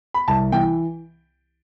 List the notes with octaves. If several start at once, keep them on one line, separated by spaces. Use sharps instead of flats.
B5
C2 A5
E3 G5